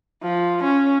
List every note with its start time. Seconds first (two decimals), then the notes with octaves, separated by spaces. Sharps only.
0.23 F3
0.64 C#4